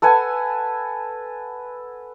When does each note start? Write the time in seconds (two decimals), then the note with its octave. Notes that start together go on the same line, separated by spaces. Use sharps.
0.02 A4 B4 F#5 G#5